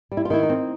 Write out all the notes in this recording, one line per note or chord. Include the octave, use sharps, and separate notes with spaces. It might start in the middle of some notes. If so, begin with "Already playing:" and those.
G3
E4
F4
D#3 E4
D#4
C4